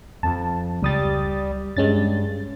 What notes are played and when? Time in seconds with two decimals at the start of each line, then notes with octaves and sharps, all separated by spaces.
0.23 F2 A5
0.83 C#2 G3 D#6 A6
1.76 G2 G#3 C#4 A6